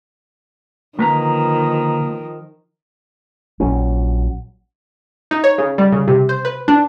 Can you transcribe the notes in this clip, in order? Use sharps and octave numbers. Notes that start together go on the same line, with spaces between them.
D3 D#3 F3 A#3 B4 A#5
A#1 F#3 C#4
D#4
C#5
C#3
G3
C#3
C3
C5
B4
D4